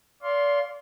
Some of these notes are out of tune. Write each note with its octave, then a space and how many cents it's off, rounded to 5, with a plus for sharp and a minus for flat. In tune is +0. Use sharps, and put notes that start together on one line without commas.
D5 -35 F5 +0 C6 +10